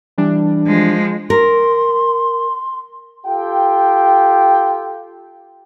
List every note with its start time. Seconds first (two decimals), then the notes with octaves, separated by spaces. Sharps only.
0.18 E3 G3 D4
0.67 F3 G#3
1.30 A#4 C6
3.26 F4 G4 A4 G5